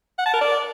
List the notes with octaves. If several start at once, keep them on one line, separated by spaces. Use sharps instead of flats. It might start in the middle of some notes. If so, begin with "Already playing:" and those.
F#5
A5
A#4
D5